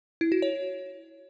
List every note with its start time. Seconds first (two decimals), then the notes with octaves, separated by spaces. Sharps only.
0.21 E4
0.32 F#4
0.42 C#5